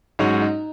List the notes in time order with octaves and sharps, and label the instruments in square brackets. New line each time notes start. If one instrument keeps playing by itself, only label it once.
[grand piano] G#2 F#3 C#4 F#4 [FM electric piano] D#4
[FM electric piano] D#4